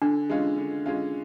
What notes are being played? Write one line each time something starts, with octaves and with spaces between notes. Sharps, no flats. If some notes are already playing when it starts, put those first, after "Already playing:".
D3 D4
G#3 C#4 F4
D3
G#3 C#4 F4